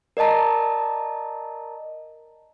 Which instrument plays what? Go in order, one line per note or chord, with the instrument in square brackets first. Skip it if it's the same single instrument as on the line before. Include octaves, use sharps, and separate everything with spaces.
[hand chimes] A#4 D5 D#5 A5 A#5